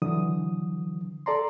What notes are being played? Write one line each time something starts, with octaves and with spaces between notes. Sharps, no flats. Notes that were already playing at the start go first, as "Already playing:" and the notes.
D3 E3 F#3 D#6
A4 D5 A#5 C6